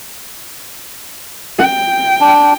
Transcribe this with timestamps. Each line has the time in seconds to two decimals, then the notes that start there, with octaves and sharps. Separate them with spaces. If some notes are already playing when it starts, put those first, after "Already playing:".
1.58 G5
2.21 D4